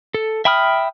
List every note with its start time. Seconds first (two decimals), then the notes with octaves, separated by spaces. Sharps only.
0.14 A4
0.45 E5 G5 B5 D#6 F6